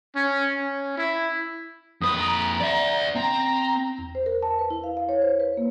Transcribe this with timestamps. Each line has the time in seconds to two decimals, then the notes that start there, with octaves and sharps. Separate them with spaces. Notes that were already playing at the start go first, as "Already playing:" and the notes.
0.16 C#4
0.54 C#4
0.97 E4
2.01 F2 B4 D#6
2.20 A#5
2.60 D5 E5
3.15 C4 A#5
3.98 E2
4.15 C5
4.26 A#4
4.43 A5
4.59 B4
4.70 E4
4.84 F5
4.97 F5
5.09 C#5
5.22 C5
5.40 B4
5.57 A#3